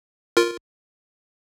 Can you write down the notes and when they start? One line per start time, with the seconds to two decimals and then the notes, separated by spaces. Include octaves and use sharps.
0.37 F4 A#4